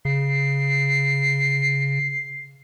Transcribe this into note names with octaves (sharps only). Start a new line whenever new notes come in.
C#3 C7